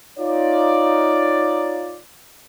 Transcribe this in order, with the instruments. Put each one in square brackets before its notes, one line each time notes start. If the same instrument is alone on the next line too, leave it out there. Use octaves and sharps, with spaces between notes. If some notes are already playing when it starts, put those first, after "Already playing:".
[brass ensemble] D#4 F4 C#5 D5